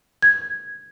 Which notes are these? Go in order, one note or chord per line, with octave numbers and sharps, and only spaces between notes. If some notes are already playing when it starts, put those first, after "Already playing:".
G#6